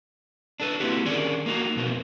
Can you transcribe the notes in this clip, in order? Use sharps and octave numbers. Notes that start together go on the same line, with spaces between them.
D4 A4 B4
A#3 C4 E4 F#4 G4
D3 D#3 C#4 G#4 A#4 D5
A#3 D#4 F#4
F2 B2 A#3 C4